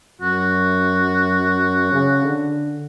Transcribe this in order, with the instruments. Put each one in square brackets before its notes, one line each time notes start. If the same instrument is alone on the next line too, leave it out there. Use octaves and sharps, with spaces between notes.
[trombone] F#2 [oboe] F#4
[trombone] C#3
D3